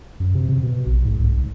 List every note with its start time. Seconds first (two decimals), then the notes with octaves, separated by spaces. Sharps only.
0.20 F#2
0.35 C3
0.49 C3
0.62 B2
0.86 A#1
1.05 G#2
1.19 C2
1.37 C#2